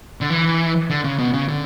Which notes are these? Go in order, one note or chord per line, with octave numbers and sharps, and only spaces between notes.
D3
E3
D3
C#3
B2
C#3
D3